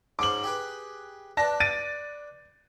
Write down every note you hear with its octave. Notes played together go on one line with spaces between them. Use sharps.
G#2 C#4 C5 D6 F#7
G4 G#4 B4
D4 B4 A5 A#6
A6 D7 D#7